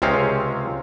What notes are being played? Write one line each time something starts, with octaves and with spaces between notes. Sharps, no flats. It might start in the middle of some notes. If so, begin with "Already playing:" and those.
C#2 C3 G#3 C4 C#4 F5